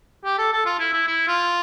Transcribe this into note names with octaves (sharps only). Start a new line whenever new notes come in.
G4
A4
A4
F4
E4
E4
E4
F4